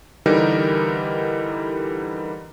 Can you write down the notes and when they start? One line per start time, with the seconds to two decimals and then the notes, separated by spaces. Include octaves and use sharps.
0.26 D3 E3 G3 D#4 G4 A#4